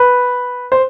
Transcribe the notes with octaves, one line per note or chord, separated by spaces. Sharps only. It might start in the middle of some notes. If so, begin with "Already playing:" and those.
Already playing: B4
C5